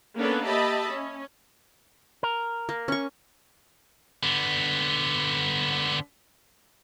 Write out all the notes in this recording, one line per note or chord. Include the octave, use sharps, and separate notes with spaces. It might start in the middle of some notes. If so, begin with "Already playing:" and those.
A#3 B3 C#4 D4 A4 B4
G4 D#5 E5 A5 B5
C#4
A#4
A#3
C#4 C#6
D3 B3